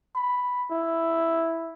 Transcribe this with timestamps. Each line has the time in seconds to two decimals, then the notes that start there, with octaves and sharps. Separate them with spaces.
0.15 B5
0.71 E4